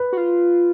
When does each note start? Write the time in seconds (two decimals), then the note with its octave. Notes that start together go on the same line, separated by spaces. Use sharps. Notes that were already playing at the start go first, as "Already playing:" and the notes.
Already playing: B4
0.13 F#4
0.17 F4